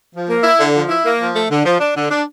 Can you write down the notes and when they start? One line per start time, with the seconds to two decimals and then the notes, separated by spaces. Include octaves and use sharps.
0.14 F3
0.29 A#3
0.44 E4
0.59 D3
0.74 F3
0.89 E4
1.05 A#3
1.20 F3
1.35 A3
1.50 D3
1.65 F3
1.80 D4
1.95 D3
2.10 D4